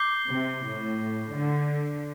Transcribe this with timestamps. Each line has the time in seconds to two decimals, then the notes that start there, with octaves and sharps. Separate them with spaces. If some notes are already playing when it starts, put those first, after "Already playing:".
Already playing: D6 G6 C7 G7
0.29 C3
0.65 A2
1.35 D3